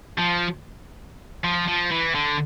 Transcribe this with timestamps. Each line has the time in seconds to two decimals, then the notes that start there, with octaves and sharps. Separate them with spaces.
0.18 F3
1.44 F3
1.68 F3
1.91 E3
2.15 D3